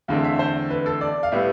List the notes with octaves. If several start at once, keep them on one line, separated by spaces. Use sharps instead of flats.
E2 D3 A3 C4 F5
E5
C5
B4
A4
D5
F5
A2 G3 B3 E5